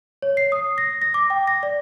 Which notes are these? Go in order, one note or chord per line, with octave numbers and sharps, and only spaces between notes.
C#5
C7
D#6
A#6
A#6
D6
G5
A#6
D5